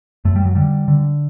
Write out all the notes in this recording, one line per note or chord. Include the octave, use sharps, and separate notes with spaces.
F#2 A3
G3
F#3
D3 G3
D3